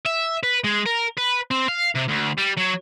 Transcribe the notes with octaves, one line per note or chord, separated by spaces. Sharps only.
E5
B4
G#3
A#4
B4
C4
F5
C3
D2
G3
F#3